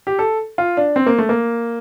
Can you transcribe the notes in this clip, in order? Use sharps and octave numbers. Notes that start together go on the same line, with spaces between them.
G4
A4
F4
D4
C4
A#3
A3
A#3